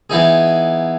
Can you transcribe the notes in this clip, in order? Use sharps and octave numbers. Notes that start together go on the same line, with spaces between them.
E3 B3 D#4 G#4